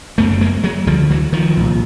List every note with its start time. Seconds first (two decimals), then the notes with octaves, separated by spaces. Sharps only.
0.18 F#1 F#2 C#3 A3 B3
0.41 G#3 A#3
0.63 F#3 G#3
0.87 D2 D3 F3 G3
1.10 E3 F#3
1.33 D#3 F3
1.57 C2 A#2